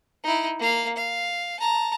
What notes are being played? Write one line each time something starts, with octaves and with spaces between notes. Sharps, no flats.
D#4 E4
A#3 F5
F5
A5 A#5